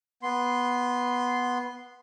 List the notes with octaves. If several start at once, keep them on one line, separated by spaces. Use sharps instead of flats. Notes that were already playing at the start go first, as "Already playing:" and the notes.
B3 C6